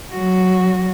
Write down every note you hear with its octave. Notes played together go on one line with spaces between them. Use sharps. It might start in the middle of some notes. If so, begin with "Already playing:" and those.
F#3 F#4